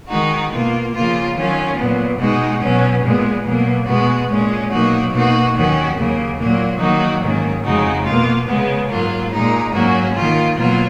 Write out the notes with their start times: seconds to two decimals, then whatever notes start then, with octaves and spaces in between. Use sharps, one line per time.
0.08 D#3 G#3 D#4 F#4
0.51 B2 A#3 F4
0.92 C#3 F3 A#3 F4
1.35 D#3 F#3 C#4 F4
1.76 A#2 F#3 B3
2.19 B2 G#3 D#4 F#4
2.60 B2 F#3 C#4
3.03 A#2 G#3 B3
3.44 B2 F#3 A#3
3.86 B2 G#3 B3 F#4
4.28 A#2 G#3 C#4
4.70 B2 F#3 A#3 D#4 F#4
5.11 B2 A#3 D#4 F#4
5.54 D#2 D#3 F#3 C#4 F#4
5.96 D#2 C#3 F#3 A#3
6.37 A#2 F#3 A#3
6.79 D#3 F#3 A#3 D#4 F#4
7.21 G#2 D#3 F#3 A#3 C#4
7.64 F2 C#3 G#3 D#4 F#4
8.05 B2 A#3 F4
8.47 C#3 G#3 B3
8.89 G#2 F#3 A#3 F4
9.31 A#2 G#3 D#4
9.74 G#2 F#3 A#3 C#4 F#4
10.15 D#3 A#3 F4
10.57 B2 F#3 A#3 F4